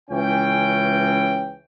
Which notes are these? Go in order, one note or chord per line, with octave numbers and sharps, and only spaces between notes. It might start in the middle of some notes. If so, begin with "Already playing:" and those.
C#2 E3 C#4 G5